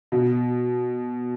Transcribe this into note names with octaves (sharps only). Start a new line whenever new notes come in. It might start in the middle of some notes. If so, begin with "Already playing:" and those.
B2